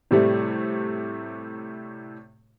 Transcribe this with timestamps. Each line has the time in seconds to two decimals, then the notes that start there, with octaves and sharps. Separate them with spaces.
0.11 A2 C3 G3 A3